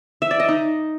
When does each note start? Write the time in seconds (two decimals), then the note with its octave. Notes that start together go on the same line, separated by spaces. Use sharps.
0.22 E5
0.31 D5
0.40 D#5
0.48 D#4